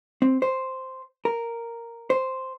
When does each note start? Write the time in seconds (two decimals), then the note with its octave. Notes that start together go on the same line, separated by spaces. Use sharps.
0.22 C4
0.42 C5
1.25 A#4
2.10 C5